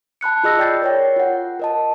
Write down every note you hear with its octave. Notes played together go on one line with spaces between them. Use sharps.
A5 B5 F#6 C#7
F4 G#4 D#5 E6 A#6
D5 G5 G6 A6 C7
A#4 C#5 G5
F4 F#5
A#4 D#5 A5